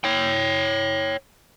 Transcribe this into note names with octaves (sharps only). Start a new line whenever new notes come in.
C#5 G5